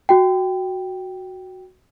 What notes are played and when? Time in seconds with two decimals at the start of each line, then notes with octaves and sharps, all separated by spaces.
0.09 F#4 G5